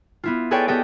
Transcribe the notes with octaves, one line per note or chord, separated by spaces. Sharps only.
B3 E4 F4
G#4 A4 B4 C#5 D5 G5
B3 G4 A4 D5 D#5 G5